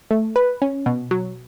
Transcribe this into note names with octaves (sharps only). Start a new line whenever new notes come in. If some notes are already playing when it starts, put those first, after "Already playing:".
A3
B4
C#4
B2
F#3